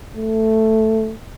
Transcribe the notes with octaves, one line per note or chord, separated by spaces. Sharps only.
A3